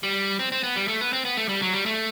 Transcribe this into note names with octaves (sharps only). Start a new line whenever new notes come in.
G3
C4
C4
B3
G3
A3
B3
C4
B3
A3
G3
F#3
G3
A3